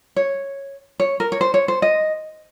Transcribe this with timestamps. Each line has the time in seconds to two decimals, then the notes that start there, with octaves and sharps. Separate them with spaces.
0.16 C#5
1.00 C#5
1.20 A#4
1.32 C#5
1.41 C5
1.54 C#5
1.68 C5
1.82 D#5